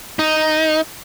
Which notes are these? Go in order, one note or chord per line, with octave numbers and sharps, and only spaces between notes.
D#4